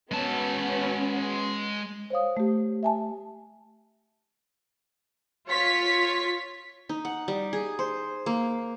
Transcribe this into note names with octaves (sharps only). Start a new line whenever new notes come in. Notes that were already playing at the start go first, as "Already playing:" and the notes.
G#3 B3 C#4 F#4 A5
C5 C#5 F5 D#6
A3 G4
E5 G#5 A5
F4 C#5 B6
D#4
F#5
G3
G#4
C5
A#3